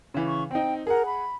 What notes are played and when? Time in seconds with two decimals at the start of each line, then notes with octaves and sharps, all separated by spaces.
0.14 C#3 E3
0.27 C#6
0.51 C4 D#4 G5
0.87 G#4 A#4 F#5
1.06 B5